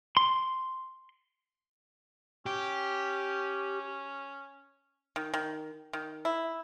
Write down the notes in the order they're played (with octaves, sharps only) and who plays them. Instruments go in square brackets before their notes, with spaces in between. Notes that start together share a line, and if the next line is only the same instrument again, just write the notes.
[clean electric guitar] C6
[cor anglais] C#4 [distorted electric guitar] G4
[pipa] D#3
D#3
D#3
E4